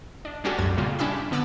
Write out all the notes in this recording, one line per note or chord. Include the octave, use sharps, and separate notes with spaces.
D4
G3 C#4 D4 F#4 G4 A4
C2 F#2 G3 G#6
A#2 C#3 G3 A#3 F4
C#4 D4 E4 G4 E5 B5
D3 B3 D5 D6 E6